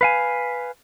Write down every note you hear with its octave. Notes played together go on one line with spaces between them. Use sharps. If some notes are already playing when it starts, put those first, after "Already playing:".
B4 F5 G#5